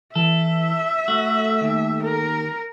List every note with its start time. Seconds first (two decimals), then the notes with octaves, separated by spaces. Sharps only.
0.16 E3 A4 E5
1.08 A3 F#4
1.61 D#2
2.03 A#4